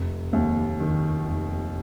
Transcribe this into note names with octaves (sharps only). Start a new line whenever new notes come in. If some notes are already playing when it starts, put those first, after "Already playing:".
Already playing: F1
D#2
D#3
F1